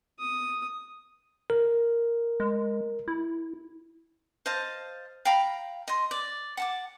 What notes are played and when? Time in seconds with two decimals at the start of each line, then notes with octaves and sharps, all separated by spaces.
0.19 D#6
1.50 A#4
2.40 G#3
3.08 E4
4.46 C5 D#5 F5 A5
5.25 F5 G5 A#5 B5
5.88 D#5 C6
6.11 D5
6.57 F#5 A5 D6